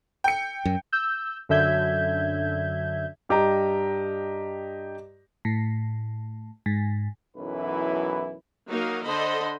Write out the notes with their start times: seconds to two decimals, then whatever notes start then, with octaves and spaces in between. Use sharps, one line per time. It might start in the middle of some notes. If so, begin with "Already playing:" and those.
0.24 G5 C#7
0.65 F#2
0.92 E6 G6
1.49 F#2 D3 E5 G6 G#6
3.29 G2 G4 D#5 A#5
5.45 A2
6.66 G#2
7.36 B1 F#2 E3 E4 B4
8.68 F#3 A#3 D#4 A#4 F5
9.05 D3 A4 C5 D#5 B5